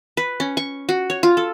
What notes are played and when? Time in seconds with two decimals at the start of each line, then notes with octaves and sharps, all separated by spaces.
0.17 B4
0.40 C#4
0.57 C#6
0.89 F#4
1.10 C#5
1.23 F4
1.37 A4